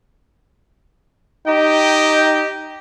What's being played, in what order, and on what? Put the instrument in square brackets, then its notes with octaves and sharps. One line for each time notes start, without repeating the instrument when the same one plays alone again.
[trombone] D#4 [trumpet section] G4 D#5 G5